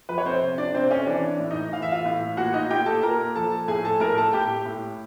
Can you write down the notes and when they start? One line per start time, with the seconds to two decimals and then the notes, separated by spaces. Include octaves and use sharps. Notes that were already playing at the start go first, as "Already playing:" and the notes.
0.09 F3 B4
0.18 C#5
0.25 C4 C5
0.43 C3
0.58 D4 D5
0.74 C3 C4 C5
0.91 C#4 C#5
1.07 E3 D4 D5
1.40 A2
1.50 D#4 D#5
1.72 E3 F5
1.82 E5
1.92 F4 F5
2.05 A2
2.37 A#2 F#4 F#5
2.53 D#4 D#5
2.70 A#2 G4 G5
2.86 A4 A5
3.03 A#2 A#4 A#5
3.35 F3 A4 A5
3.68 A2 G#4 G#5
3.84 A4 A5
4.00 A2 A#4 A#5
4.16 A4 A5
4.33 A2 G4 G5
4.65 A2